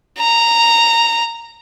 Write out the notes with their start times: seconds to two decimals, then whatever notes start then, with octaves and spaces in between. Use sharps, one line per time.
0.19 A#5